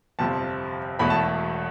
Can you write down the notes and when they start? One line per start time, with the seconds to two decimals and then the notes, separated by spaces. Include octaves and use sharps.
0.19 G1 F2 C3 F3 A5
0.99 E1 E2 B2 A3 B5
1.10 A5